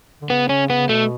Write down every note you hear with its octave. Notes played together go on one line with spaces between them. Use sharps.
D3
C#3 B3
C#4
B3
B2 A3